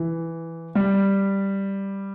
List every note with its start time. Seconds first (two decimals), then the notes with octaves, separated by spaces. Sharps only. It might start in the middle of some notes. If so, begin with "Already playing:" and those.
Already playing: E3
0.75 G3